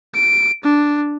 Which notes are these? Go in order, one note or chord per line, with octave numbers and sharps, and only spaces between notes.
D7
D4